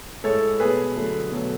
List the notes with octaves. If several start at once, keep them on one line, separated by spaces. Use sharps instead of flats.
A2 G#3 A4 C#5
B2 A3 G#4 B4
D3 F#3 A3
B2 F#3 A3